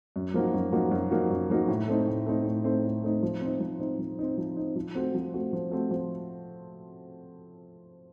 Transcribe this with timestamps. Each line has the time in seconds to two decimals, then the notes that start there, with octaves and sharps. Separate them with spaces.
0.16 F#2
0.34 F3 A#3 D#4 F#4
0.54 F#2
0.72 F3 A#3 D#4 F#4
0.91 F#2
1.11 F3 A#3 D#4 F#4
1.30 F#2
1.50 F3 A#3 D#4 F#4
1.69 A2
1.88 A3 C4 D#4
2.08 A2
2.26 A3 C4 D#4
2.45 A2
2.64 A3 C4 D#4
2.84 A2
3.03 A3 C4 D#4
3.23 F3
3.41 C4 D#4
3.60 F3
3.80 C4 D#4
3.99 F3
4.19 C4 D#4
4.38 F3
4.57 C4 D#4
4.76 F3
4.95 A3 C4 F#4
5.15 F3
5.34 A3 C4 F#4
5.53 F3
5.71 A3 C4 F#4
5.91 F3